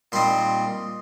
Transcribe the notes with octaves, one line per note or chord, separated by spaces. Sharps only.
A#2 G3 C4 D#4 C6